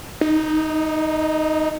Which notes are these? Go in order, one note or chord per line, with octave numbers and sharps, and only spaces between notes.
D#4